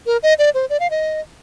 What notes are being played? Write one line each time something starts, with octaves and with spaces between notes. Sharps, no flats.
A#4
D#5
D5
C5
D5
F5
D#5